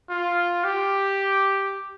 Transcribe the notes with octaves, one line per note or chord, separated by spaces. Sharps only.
F4
G4